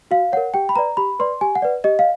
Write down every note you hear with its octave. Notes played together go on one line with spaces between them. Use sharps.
F#4 F5
A#4 C#5 F#5
G4 G5
B5
B4 D5 A#5
G4 B5
B4 D5 C6
G4 G#5
F#5
B4 D5
G4 D#5
F5